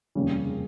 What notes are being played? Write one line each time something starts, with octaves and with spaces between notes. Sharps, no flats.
F1 D#2 C#3 G3 C#4